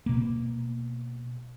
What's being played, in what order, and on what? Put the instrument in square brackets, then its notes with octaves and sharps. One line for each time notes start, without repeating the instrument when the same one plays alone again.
[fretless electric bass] B2 A#3